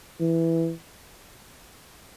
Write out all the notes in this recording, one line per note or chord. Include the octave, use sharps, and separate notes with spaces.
E3